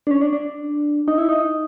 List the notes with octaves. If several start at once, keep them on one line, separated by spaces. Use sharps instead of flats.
D4
C#4
D4
D4
D#4
E4
D#4